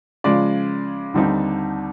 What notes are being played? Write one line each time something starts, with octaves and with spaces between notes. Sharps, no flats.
C#3 F3 G#3 D5
D#2 D3 G3 C4 D#4